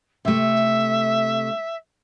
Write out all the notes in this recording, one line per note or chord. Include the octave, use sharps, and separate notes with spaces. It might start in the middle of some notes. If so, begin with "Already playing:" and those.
C3 A3 E5